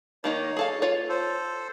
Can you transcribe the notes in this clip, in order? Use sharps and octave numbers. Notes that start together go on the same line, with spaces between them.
D#3 A#3 D#4 C#5
G#4 A4 F5
F4 C#5
A4 C5